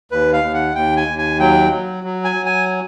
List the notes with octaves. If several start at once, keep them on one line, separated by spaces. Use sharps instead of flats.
D#2 B4
F5
D#2
F#5
D#2 G5
G#5
D#2
G#5
F#3 G5
F#3
F#3
G#5
F#3
G#5